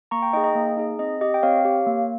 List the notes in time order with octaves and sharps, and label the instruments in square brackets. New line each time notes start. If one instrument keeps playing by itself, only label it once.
[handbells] A#3 A#5 C#6
G5 A#5
D#4 G#4 D#5 G5
D#5
A#3
D#4 G#4
C4 D#5
G4 D#5
G5
C4 C#5 F5
G4
A#3